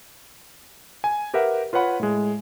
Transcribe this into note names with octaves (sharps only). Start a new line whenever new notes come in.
G#5
G4 A#4 B4 E5 F#5
F4 B4 C#5 F#5 B5
A2 G#3